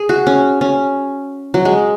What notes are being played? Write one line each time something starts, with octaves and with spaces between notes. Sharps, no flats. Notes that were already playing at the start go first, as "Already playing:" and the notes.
Already playing: G#4
F#4
C#4
C#4
F#3
G#3